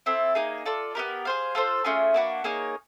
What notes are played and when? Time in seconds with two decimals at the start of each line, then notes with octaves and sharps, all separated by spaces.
0.06 C4 E4 A4
0.35 A#3 D#4 G#4
0.66 F4 A4 D5
0.95 B3 D4 G4 A#4
1.25 G#4 C5 F5
1.55 F4 A4 C5
1.84 A3 C#4 F4 G#4
2.14 A#3 D4 F#4 B4
2.44 A#3 D#4 G#4 C#5